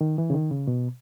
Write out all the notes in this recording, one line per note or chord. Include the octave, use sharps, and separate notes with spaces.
D#3
E3
C#3
D#3
C#3
B2